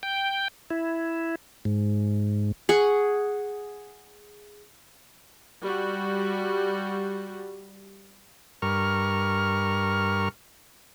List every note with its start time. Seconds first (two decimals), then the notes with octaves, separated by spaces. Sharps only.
0.03 G5
0.70 E4
1.65 G#2
2.69 G#4 F#5 C#6
5.63 G3 F#4
8.62 G2 A#4 C#6 F6